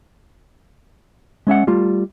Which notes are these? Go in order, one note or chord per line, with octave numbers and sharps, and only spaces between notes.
G#3 C#4 E5 F#5
G3 A3 F4